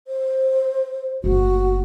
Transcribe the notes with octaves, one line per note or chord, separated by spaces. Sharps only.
C5
F#1 A3 F#4